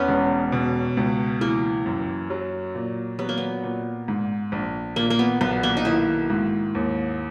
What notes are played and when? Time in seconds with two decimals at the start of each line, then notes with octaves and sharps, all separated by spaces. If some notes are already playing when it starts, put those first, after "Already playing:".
Already playing: E2 B3 C#4
0.08 E1
0.52 B2
0.97 C#2
1.41 E3 A#3
1.86 F#2
2.30 F#3
2.75 A#2
3.19 F#3 B3
3.29 A#3
3.38 B3
3.63 A#2
4.08 G#2
4.52 A#1
4.96 A#2 A#3
5.10 A#3
5.19 B3
5.41 B1 B3
5.63 A#3
5.77 D#4
5.85 D#3 E4
6.30 G#2
6.75 D#2